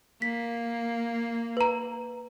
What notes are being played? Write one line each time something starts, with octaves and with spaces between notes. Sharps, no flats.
A#3 B6
B4 A#5